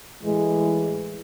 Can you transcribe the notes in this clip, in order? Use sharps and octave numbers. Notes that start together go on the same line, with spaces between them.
A2 E3 G#3